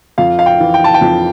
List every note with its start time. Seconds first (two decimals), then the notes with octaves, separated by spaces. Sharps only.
0.18 F2 F5
0.39 F5
0.46 G5
0.60 E3
0.74 G5
0.84 A5
0.94 G5
1.01 F2